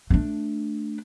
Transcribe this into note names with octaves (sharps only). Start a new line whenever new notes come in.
A3 D4